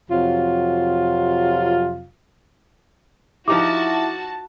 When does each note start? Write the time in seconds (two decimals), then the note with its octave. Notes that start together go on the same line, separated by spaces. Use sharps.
0.10 F2 C3 F#3 F4
3.48 F3 D#4 E4 F#4 G4 A5 D6